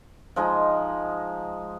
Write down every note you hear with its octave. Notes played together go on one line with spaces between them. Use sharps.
F3 G#3 D#4